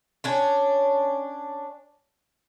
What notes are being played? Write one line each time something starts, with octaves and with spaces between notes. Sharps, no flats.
C#4 D4 C#5